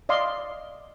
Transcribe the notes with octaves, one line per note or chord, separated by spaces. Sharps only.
D5 D#5 F5 C6